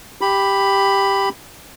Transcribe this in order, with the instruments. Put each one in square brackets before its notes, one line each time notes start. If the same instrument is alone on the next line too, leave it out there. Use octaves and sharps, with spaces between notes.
[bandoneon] G4 B5